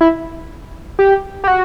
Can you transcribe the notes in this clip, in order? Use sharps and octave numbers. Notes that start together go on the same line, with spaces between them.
E4
G4
G4
F#4